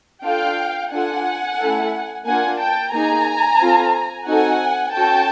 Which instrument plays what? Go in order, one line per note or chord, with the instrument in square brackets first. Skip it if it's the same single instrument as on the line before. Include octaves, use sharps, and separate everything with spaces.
[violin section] D4 F4 A4 F5 G5
D4 F4 A4 F#5 G#5
A3 C#4 E4 A4
A#3 D4 F4 F#5 G#5
G5 A5
A#3 D#4 G#4 G#5 A#5
C4 F4 A4
C4 D#4 F#4 A4 F#5 G#5
C#4 F#4 A4 G5 A5